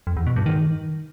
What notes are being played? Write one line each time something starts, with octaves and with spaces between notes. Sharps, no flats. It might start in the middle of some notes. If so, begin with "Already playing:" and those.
F2
E2
B2
G2
D#3